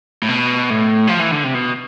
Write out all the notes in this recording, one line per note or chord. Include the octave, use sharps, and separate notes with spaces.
A2
B2
A2
F3
E3
D3
C3
B2